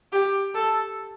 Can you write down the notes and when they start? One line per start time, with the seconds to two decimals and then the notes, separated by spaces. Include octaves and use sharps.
0.12 G4
0.54 A4